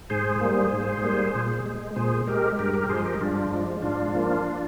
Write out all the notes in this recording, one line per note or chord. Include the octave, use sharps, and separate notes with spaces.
G#2 G#4 C5
G3 A#3
G#2
G3 A#3
A#2
G#3
A#2 G#4 C5
G#3 G4 A#4
G2 G4 A#4
G4 A#4
F3 G#3 G#4 C5
G4 A#4
G2 D4 F4
F3 G#3
G#2 D4 F4
F3 A#3